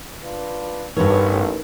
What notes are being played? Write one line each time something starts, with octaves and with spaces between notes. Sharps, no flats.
D4 F4 B4
A1 G2 B3 D#4 A#4 B4 C#5